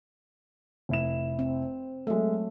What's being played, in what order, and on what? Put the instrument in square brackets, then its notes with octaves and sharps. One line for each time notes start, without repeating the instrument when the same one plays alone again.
[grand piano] F1 E4 E7
[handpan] C4
[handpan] F#3 A3 [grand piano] G#3 E5